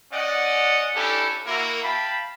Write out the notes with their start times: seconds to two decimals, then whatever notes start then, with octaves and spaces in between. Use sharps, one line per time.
0.12 C#4 D5 D#5 F#5
0.95 C#4 D4 E4 G4 A4
1.47 A#3 E4 F#4 A#4
1.84 F5 G5 A5 B5